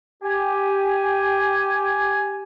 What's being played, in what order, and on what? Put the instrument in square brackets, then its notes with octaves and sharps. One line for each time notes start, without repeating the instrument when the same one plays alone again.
[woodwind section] G4 G#5